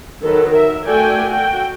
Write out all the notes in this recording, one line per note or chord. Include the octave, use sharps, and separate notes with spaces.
D#3 F#3 A4 B4
A#4 E5
A3 F#4 A4 D5 G5 G#5
F#4 A4 G5